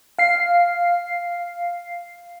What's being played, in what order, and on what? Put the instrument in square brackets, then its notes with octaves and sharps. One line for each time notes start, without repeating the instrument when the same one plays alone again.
[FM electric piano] F5 C7